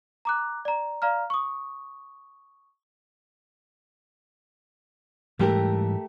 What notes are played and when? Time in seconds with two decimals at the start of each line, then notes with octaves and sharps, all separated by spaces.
0.25 A#5 D6 F#6
0.65 D5 A#5
1.02 D5 F5 A#5 F6
1.30 C#6 D#6
5.39 G#2 E3 G3 A3 G4 A#4